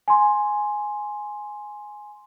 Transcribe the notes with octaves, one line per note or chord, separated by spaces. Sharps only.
G#5 C6